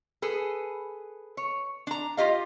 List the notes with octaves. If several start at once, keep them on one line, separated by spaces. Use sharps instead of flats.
G#4 A4 B4
C#5
D4 A#5
F4 G4 D#5 F5